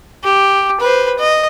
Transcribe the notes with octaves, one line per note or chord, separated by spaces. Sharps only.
G4
B4 C5
D#5